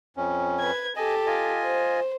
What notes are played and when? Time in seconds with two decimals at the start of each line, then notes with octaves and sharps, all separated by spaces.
0.17 F2 C#4
0.59 B4 G#6
0.96 G4 A4 D#5 G#5
1.26 F4 D#5 G#5
1.64 C5